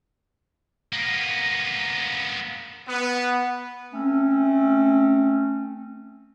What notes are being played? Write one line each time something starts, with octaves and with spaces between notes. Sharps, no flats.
A#3 B3
B3
A3 C4 C#4